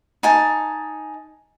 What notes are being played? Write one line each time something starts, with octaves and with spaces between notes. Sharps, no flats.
D#4 G#5 A5